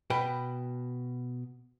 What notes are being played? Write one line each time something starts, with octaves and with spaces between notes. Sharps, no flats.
B2 B4 G5